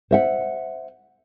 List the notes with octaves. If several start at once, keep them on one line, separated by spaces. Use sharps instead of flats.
C5 E5 F#5